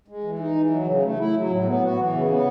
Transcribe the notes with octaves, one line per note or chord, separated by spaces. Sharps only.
G#3
E3
D#4
E3
F#3
C#3
A3
E4
F#3
A2
B3
F#4
E3
C#3
B3